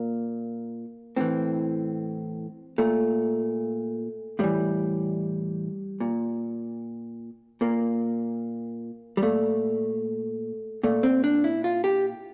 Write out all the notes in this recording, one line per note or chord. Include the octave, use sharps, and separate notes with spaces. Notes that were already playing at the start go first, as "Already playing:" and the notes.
Already playing: A#2 A#3
A2 E3 C4
A#2 A3
A2 E3 G3
A#2
A#2 A#3
G3
A#2 A3
A#2 A3
C4
D4
E4
F4
G4